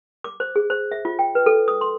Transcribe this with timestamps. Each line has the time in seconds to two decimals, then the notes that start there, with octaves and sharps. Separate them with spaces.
0.24 D6
0.40 C5
0.56 G#4
0.70 C5
0.92 E5
1.05 F4
1.19 G5
1.35 B4
1.46 A4
1.68 D#6
1.81 C6